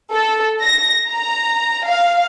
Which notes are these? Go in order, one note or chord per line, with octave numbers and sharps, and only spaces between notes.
A4
A#6
A#5
F5